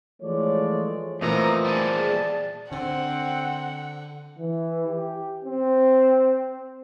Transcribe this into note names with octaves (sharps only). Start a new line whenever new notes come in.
E3 F3 G#3 A3 C#5 D5
F2 A#2 E3 A3 C5 D#5 A#5
G3 G#4 A5
D5
D3 C4 F#5
E3
G4
C4